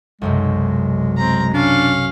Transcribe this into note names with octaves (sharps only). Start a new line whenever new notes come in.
B1 F#2 C3 G#3
C4 A#5
C#4 D4 F5